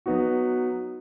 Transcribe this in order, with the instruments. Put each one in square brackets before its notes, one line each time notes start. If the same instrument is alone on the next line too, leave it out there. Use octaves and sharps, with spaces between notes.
[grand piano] F#3 B3 D#4 F#4